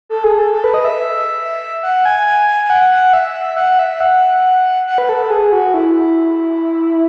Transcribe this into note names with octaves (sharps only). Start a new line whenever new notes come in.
A4
G#4
A4
A4
B4
D#5
E5
F#5
G#5
G#5
G#5
G#5
F#5
F#5
E5
F#5
E5
F#5
F#5
B4
A4
A4
G#4
F#4
E4